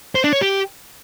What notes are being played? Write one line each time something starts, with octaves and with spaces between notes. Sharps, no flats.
C5
D4
C#5
G4